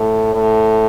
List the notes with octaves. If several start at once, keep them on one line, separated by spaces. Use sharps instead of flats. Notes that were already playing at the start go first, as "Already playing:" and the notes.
Already playing: A2
A2